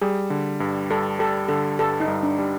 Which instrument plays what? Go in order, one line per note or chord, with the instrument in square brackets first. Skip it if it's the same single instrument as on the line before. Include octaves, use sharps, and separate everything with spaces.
[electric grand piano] G3 [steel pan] G#4
[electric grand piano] D3
G2
[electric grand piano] G2 [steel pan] A4
[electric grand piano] G3 [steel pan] A4
[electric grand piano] D3 [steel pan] A4
[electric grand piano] G2 [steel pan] A4
[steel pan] D#4
[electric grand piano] G2
[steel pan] D4
[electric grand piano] G3